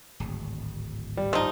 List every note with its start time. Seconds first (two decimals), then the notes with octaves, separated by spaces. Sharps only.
0.20 D1 G#1
1.17 G3
1.33 F3 D#4